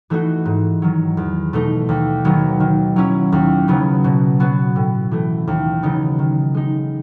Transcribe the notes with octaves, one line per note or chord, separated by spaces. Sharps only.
E3 A3 D#4 F#4
G#2
D#3 F#3
E2
B2 A3 D#4
D#2
D#3 F#3 B3
D#3
F#3 C#4 E4
D#2
C#3 F#3 B3
B2
F#3 B3 F#4
A2
E3 A3
D#2
C#3 F#3 B3 D#4
D#3
G#3 D#4